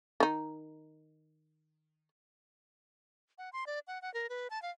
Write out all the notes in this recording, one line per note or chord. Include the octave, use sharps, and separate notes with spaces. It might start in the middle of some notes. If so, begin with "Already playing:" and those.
D#3 D#4
F#5
C6
D5
F#5
F#5
A#4
B4
A5
F5